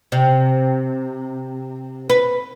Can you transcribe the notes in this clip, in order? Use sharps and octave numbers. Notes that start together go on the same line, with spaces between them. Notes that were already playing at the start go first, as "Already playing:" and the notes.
C3
B4